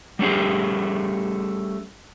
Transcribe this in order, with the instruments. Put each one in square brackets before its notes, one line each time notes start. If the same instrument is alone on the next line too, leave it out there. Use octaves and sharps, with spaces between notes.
[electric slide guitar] G3 A3 C#4 G4 G#4